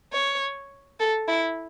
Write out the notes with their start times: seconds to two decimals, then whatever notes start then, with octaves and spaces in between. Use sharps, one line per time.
0.13 C#5
1.00 A4
1.29 E4